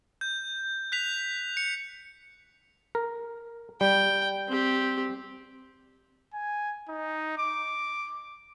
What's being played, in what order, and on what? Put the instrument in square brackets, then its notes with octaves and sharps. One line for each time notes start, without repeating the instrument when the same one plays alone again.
[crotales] G6
F#6 B6 F7
C#7
[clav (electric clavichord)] A#4
[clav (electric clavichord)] G3 [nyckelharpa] G5
[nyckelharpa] C4 G4
[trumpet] G#5
D#4
D6